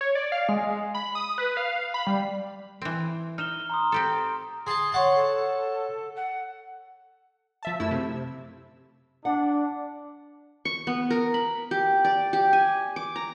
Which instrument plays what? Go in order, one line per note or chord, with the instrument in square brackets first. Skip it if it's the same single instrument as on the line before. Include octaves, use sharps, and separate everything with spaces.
[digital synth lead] C#5
D5
F5
G#3
B5
D#6
B4
F5
B5
G3
[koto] E3 C4
[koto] D#4 [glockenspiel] F6 E7 G7
[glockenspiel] A#5 C6 D#6
[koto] C4 G4 A4
[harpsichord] G#4 A5 [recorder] C6
[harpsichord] C#5 F#5 A5
[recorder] A4
F#5
[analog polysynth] F3 E5 A5
F#2 A3 E4 E6
C3
[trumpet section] D4 [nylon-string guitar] F#5
[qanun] C#6
B3
A#4
B5
G4
D5
G4
G#5
D6
A#5